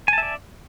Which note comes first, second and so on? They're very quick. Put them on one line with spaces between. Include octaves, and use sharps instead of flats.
G#5 A5 E5 D5